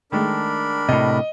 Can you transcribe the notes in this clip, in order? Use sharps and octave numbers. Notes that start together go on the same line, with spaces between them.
D#3 G#3 A3 D4 A#4 B5
A2 C3 D#5